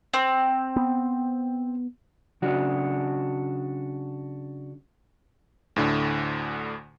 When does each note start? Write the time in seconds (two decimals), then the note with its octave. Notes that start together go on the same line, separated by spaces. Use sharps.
0.13 C4
0.76 B3
2.42 C#3 F#3 D4 F#4
5.76 D2 A2 D3